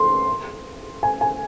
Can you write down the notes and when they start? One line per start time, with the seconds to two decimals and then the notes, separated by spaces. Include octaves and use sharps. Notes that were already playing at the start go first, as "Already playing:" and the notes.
Already playing: C6
1.03 G#5
1.21 G#5